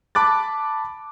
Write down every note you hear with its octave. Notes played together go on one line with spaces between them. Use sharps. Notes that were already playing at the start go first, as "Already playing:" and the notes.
A5 B5 D6 F#6 A6